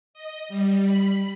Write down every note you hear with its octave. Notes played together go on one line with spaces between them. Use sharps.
D#5
G3
B5